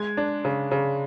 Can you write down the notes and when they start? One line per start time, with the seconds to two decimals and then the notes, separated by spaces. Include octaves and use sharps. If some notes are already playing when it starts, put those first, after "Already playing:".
Already playing: G#3 G#6
0.17 D4
0.45 C#3
0.71 C#3